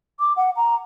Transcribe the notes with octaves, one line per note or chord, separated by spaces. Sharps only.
D6
F#5
A#5